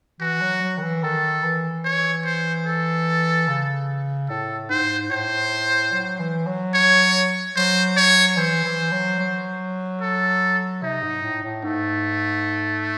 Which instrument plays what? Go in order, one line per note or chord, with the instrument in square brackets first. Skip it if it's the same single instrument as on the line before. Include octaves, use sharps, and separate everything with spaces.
[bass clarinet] E3 [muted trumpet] F#4
[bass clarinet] F#3
F#3
D#3
E3
[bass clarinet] D#3 [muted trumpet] A4
[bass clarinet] E3
[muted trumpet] C#5
C5
A4
[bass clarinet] C#3
[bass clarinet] A2 [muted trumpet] A4
[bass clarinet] G#2 [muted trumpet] C5
[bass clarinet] A2 [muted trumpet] C5
[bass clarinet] F#3
E3
F#3
[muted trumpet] C#5
[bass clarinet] F#3 [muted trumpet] C5
[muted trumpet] C#5
[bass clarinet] E3 [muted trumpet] C5
[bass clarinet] E3
F#3
F#3
[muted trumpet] A4
[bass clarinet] C3 [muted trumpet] D#4
[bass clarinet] G#2
A2
A2
[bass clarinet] G#2 [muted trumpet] A3